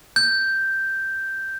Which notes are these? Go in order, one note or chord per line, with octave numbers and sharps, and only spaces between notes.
G6